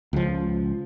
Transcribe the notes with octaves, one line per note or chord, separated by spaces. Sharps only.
C#2 F3